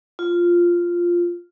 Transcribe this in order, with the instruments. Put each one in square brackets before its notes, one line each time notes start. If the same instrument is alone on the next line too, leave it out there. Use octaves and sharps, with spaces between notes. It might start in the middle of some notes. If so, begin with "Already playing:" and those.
[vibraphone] F4